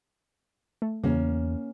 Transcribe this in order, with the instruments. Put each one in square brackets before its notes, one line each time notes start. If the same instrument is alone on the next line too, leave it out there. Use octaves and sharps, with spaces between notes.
[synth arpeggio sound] A3
[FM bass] E2 [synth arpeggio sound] C#3 [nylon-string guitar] A#3 C#4